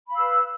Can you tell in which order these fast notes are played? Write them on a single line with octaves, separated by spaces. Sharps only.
B5 F5 E6 B4